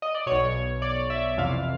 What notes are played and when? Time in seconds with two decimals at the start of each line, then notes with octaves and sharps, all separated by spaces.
0.02 D#5
0.15 D5
0.26 B1 B2 C#5
0.82 D5
1.10 E5
1.38 F2 C3 E3 F5